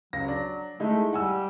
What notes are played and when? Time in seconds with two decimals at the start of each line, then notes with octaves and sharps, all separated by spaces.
0.13 C#2 F#3 A#6
0.28 D4
0.80 G#3 A3 D#4 E4
1.13 G3 F#5 G#5 E6